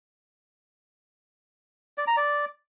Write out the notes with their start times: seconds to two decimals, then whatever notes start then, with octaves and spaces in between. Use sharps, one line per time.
1.98 D5
2.07 A#5
2.17 D5